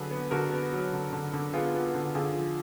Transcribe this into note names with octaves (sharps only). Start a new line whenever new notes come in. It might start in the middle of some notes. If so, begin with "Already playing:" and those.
Already playing: D3 F#3 G#4 B4
B3
D3 F#4 A#4
B3
F#3
D3
D3
D3
B3 F4 G#4
B3
D3
D3 F4 G#4
F3